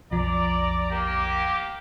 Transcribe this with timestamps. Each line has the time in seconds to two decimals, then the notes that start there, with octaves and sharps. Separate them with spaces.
0.11 B1 F2 F3 D5 A#5
0.91 A#3 G4